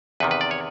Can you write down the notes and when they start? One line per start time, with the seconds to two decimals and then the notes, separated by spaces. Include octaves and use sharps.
0.20 E2 C3 D#3 B4
0.31 B4
0.41 D5
0.51 C#5